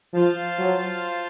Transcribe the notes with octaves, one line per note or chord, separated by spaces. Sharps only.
F3 F4 C5 F5 A5
F#3